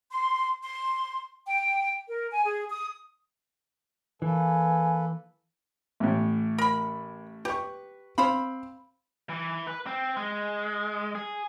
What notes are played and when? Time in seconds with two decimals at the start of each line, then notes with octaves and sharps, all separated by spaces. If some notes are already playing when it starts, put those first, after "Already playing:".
0.12 C6
0.63 C6
1.47 G5
2.09 A#4
2.32 G#5
2.45 G#4
2.70 D#6
4.22 E3 A#3 A4 B4 G#5
6.00 A1 A2
6.58 A#4 B5
7.45 G4 B4 C#6
8.18 C4 C5 F5 B5
9.29 E3
9.67 B4
9.86 C4
10.17 G#3
11.15 G#4